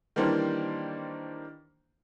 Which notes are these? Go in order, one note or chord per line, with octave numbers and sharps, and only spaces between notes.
D#3 E3 G3 A#3 D4 C5